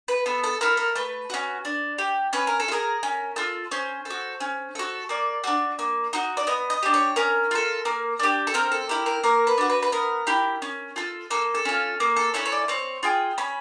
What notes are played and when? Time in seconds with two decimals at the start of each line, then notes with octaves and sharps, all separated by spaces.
0.08 B4
0.26 B3 A4
0.44 A4
0.61 E4 A4 A#4
0.77 A#4
0.95 A3 B4
1.30 C#4 F#4
1.65 D4
1.98 G4
2.33 C#4 B4
2.47 A#4
2.60 A4
2.68 F4
2.72 G#4 A#4
3.03 C#4
3.36 F4 A4
3.71 C#4 C5
4.05 A4
4.10 F#4
4.40 C#4
4.75 F#4 A4
5.09 A#3 D5
5.44 D4 F#4
5.79 A#3
6.13 D#4 F#4
6.37 D5
6.47 B3 D#5
6.70 D#5
6.83 D4 G4
6.94 C#5
7.16 C#4 A#4
7.51 F4 A4
7.85 A#3
8.19 D4 G4
8.47 A4
8.54 C4 A#4
8.72 A4
8.89 E4 G4 A#4
9.06 A#4
9.23 A#3 A#4
9.47 B4
9.58 D4 F#4
9.70 B4
9.83 B4
9.92 B3 A#4
10.27 E4 G4
10.62 C#4
10.96 F4 A4
11.31 A#3 A4
11.55 A4
11.65 C#4 F4
12.00 A#3
12.16 A4
12.34 C#4 E4 A4 C#5
12.46 C#5
12.52 D5
12.68 C4 C#5
13.03 F4 G#4 G5
13.38 C#4 B5